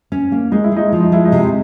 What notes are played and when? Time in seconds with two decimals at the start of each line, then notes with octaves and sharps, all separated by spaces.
0.12 C#4
0.32 A#3
0.52 G#3 D#4
0.64 E4
0.72 G#3 D#4
0.89 F3 E4
1.00 D#4
1.12 G#3 E4
1.25 D#4
1.32 C3
1.37 E4